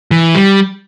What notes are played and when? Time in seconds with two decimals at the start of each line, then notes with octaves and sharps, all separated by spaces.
0.11 E3
0.35 G3